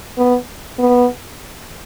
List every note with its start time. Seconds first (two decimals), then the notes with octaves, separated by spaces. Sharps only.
0.17 B3
0.79 B3